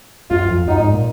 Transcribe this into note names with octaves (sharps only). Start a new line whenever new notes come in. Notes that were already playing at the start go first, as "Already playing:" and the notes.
F#2 F4
F2
F#2 D#4
G#2
A#2